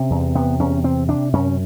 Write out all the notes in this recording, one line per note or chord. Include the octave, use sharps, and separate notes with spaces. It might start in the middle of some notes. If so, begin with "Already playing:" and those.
Already playing: C3 C#4
E2
C3 B3
E2 C#4
C3 C4
C3 D4
F#2 C#4